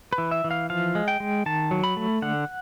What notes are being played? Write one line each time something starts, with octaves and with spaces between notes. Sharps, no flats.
B4
E3
E5
E3
F5
F3 F5
G#3
G5
G#3
D#3 A5
F#3
B5
A3
D3 F#5